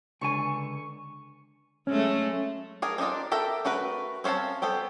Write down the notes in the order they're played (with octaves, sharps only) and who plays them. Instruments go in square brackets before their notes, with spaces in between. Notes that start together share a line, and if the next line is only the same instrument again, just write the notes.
[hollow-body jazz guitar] C#2 D3 G#5 [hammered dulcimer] C#6
[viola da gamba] F#3 G#3 A3 [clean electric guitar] C#4
[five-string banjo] D4 G#4 A#4
C4 D4 D#4 F4 D5
A4 A#4 E5 G5
A3 F#4 A#4 B4
C4 C#4 C5 F5 A5
B3 A4 C5 G5